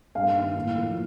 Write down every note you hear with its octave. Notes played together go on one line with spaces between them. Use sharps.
G2 F5
D#3 A#3 D#4
A2
F3 A#3